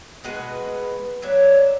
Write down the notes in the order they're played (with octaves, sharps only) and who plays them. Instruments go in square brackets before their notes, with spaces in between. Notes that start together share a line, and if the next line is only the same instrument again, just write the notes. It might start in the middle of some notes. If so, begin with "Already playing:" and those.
[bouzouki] B2 G#3 F#4 B4
F#3 D4 C#5 E5